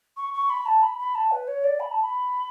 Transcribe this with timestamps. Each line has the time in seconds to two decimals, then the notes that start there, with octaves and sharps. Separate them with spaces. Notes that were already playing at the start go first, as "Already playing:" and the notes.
0.16 C#6
0.33 C#6
0.49 B5
0.65 A5
0.82 B5
0.98 B5
1.14 A5
1.31 B4
1.47 C#5
1.63 D5
1.79 B5
1.91 A5
2.02 B5